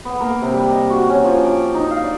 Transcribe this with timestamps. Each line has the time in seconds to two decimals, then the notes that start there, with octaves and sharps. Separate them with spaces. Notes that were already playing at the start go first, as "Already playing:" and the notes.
0.05 B3
0.20 A#3
0.41 C3
0.54 G3
0.71 D#5
0.90 F#4
1.10 C#4
1.24 F3
1.44 D6
1.75 D#4
1.91 F5
2.04 D5